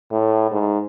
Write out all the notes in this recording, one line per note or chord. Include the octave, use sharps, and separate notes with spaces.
A2
G#2